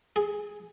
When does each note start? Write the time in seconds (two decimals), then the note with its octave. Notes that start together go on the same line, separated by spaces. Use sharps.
0.16 G#4